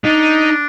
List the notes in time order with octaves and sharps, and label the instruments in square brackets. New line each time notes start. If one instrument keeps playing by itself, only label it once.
[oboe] D4 [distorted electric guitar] D#4